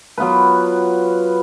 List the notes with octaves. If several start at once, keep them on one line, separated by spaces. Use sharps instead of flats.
F#3 B3 F4 B4